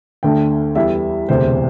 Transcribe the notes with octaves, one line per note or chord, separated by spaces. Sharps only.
D2 D3 A3 D4 G5
E2 E3 G3 E4 E5
E1 D2 C3 C5